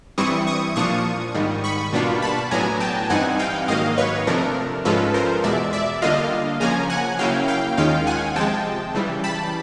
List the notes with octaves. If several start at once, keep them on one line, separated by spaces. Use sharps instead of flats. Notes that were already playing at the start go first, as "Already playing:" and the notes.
G2 E3 G3 C4 E4 C#6 D#6
C#6 D#6
A#2 F3 A#3 D4 F4 C#6 D#6
G#2 D#3 G3
B5 C#6
B2 G3 A#3 D4 F4
A5 B5
A2 F#3 B3 D4 G#5 A#5
G5 A5
G2 E3 G3 C4 D#4 F#5 G#5
F5 G5
G#2 D#3 F#3 A#3 D#5 F5
B4 C#5
C3 F3 A3 D4 A#4
G#2 F3 G#3 C#4 F4 A4 B4
A#4 C5
E2 B2 G#3 D5 E5
D5 E5
D3 G3 A#3 D4 F4 D#5 F5
C#3 F3 A#3 C#4 G#5 A#5
F#5 G#5
C#3 F#3 A#3 C#4 E4 F5 G5
F5 G5
D#2 D#3 G#3 C#4 F4 F5 G5
F#5 G#5
C3 F3 G#3 G5 A5
C#3 E3 G3
A5 B5